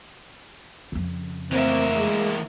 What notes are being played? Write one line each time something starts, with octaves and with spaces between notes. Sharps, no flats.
F2 C#3
E3 A3 A#3 C4 A#4 E5
G#3